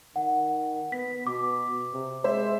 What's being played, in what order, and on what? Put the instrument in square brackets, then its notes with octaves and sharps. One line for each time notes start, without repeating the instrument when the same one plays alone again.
[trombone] D#3 [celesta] F#5
[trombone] B3 [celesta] B6
[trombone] B2 [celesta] D6
[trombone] C3
[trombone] G#3 [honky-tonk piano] C5 E5